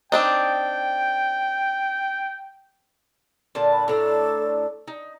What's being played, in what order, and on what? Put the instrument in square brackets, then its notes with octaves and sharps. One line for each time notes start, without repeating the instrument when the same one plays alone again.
[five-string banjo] C4 D4 D#4 [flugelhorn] G5
[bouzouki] A#2 D3 A5
[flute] B5
[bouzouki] A2 D4 A#5 [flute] A4
[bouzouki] D#4